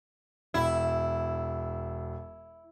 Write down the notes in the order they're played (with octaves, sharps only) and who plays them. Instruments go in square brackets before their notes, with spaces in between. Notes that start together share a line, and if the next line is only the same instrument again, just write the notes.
[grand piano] E1 [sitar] E4